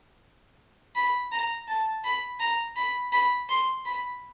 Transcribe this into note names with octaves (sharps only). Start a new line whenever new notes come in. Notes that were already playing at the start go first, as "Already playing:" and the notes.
B5
A#5
A5
B5
A#5
B5
B5
C6
B5